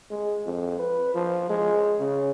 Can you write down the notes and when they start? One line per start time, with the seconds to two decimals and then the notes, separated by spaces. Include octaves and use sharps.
0.11 G#3
0.46 F2
0.79 B4
1.15 F3
1.49 G#3
1.99 C#3